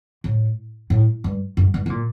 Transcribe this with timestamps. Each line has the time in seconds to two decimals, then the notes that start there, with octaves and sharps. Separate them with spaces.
0.24 A2
0.90 A2
1.24 G2
1.57 F#2
1.74 G2
1.86 C3
1.90 A#2